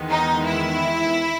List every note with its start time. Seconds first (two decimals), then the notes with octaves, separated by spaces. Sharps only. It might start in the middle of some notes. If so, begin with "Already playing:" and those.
Already playing: E2 D#3 G#3 B3
0.09 D#4
0.46 E4